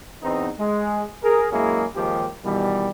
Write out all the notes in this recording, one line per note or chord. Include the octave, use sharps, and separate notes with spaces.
E2 B3 C4 D#4
G#3
G#4 A#4
F#2 G#3 A#3 C#4 E4 G#4
D#2 D#3 F3 G#3 G4
B2 D#3 E3 G3